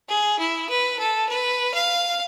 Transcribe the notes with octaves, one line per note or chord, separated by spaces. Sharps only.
G#4
E4
B4
A4
B4
F5